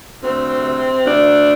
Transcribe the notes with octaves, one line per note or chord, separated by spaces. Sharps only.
D2 C4
C3
D2 D4